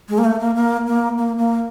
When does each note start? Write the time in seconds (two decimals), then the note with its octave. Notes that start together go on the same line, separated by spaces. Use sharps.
0.09 G#3
0.18 A#3
0.25 A3
0.40 A#3
0.55 A#3
0.87 A#3
1.18 A#3
1.38 A#3